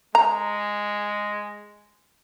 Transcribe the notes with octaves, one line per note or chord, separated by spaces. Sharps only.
G#3 A#5